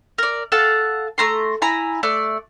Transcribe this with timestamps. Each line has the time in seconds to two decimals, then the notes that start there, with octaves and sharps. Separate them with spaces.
0.18 A#4 D5
0.52 A4 F5 F#5 A5
1.18 A3 A#5 C6
1.62 E4 G#5 A#5 B5
2.03 A3 D5 F#6